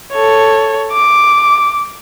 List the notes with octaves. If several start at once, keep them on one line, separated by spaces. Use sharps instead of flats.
A4 C#5
D6